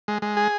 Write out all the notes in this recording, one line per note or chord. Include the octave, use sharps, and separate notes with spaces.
G#3
G#3
G#4